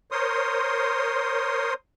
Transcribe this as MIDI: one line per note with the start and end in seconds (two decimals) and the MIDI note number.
0.12 1.74 70
0.12 1.74 72
0.12 1.74 73
0.12 1.74 84
0.12 1.74 87